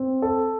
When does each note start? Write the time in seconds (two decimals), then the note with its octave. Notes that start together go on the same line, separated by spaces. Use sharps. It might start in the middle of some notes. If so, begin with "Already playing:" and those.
Already playing: C4
0.22 A4